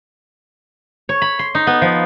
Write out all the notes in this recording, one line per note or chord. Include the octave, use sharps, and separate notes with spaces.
C#5
B5
C6
D#4
B3
F3